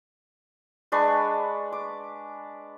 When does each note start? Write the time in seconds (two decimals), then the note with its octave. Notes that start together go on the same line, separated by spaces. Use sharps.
0.92 G#3 D4 B4 C#6
1.72 D6